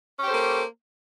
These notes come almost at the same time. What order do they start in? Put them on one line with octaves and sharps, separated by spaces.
C#4 G4 C5 A4 A#3